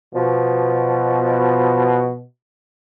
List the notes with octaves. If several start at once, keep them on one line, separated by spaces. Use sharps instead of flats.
B2 F3